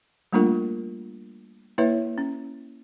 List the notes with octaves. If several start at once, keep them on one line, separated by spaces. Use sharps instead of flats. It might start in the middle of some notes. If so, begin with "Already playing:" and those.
G3 A3 A#3 D4 F4 A#4
A#3 E4 B4 C#5 E5
C#4